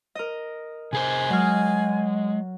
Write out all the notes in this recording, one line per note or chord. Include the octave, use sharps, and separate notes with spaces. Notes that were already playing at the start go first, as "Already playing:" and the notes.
A#4 D#5
C3 G#4 C5 G#5
F#3 G#3 F6